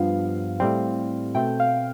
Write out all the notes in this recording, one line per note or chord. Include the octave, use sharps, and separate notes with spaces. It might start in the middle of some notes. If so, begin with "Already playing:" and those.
Already playing: G2 F3 B3 F5
A2 G3 C4
B2 A3 C4 G5
F5